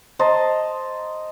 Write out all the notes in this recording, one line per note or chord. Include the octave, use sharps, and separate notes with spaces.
C5 D#5 A5 A#5